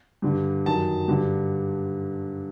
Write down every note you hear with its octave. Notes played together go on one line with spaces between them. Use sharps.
G2 D3
F#2 D#3 A5
G2 D3